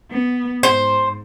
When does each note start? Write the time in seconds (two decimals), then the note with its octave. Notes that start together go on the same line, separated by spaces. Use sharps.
0.10 B3
0.63 G#2 C5